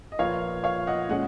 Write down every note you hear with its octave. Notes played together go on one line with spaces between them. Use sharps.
D#5
A#2 F3 A#3 F4 B4 C#5 F5
C#5 F5
D#5 F#5
A#2 G#3 C#4 D#5 F#5